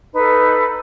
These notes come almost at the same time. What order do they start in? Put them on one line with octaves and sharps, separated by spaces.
D#4 B4 A4